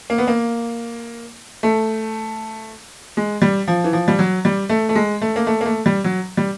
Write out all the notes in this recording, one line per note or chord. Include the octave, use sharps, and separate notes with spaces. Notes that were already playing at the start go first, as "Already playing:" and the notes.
A#3
B3
A#3
A3
G#3
G3
F3
E3
F3
G3
F#3
G3
A3
A3
G#3
A3
A#3
A3
A#3
A3
G3
F#3
G3